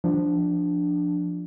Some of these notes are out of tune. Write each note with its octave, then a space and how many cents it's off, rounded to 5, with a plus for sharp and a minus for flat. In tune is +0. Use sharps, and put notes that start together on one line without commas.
F3 +0 D4 +0